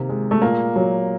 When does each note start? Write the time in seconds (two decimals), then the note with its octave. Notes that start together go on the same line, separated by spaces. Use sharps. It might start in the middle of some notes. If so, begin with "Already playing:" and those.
Already playing: C3 D#3 A#3
0.09 G#3
0.31 A3
0.42 A#2 A#3
0.76 F#3